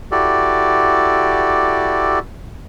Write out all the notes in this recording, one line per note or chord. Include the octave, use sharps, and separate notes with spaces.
E4 F#4 G4 A4 D5